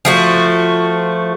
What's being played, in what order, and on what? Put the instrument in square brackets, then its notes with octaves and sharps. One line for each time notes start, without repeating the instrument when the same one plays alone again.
[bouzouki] F3 A3 F#4